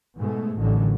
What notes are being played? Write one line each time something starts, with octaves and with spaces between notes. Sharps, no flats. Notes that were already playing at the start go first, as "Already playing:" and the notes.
G#2 B2 G#3 A3
A1 D3 D#3 F#3